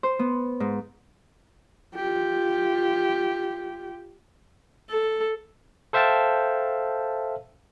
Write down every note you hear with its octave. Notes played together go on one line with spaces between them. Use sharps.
C5
B3
G#2
F4 G4
A4
A4 C5 E5 F5 G5 A5